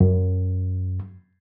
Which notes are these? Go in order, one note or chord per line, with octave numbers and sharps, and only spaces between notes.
F#2